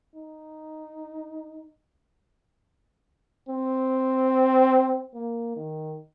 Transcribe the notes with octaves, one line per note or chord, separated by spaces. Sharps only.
D#4
C4
A#3
D#3